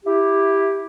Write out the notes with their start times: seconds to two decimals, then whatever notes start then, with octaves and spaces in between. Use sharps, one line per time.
0.05 E4 G4